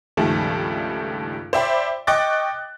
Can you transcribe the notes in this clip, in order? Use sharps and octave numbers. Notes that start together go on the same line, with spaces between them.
C#2 G2 D#3 F3 G3 A3
C5 D5 E5 G5 B5
D#5 G5 C#6 D6 F#6 A6